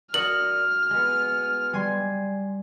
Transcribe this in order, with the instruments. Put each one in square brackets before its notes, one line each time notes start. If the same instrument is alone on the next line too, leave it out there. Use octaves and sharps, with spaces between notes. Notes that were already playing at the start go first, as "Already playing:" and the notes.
[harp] F#4 C#7 [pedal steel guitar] A#4 D5 D#6 [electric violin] F6 [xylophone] F#7
[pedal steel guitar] G#3 B3
[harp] G3 G#5 C6